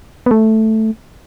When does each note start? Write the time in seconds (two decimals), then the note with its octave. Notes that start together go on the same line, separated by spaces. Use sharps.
0.26 B3
0.31 A3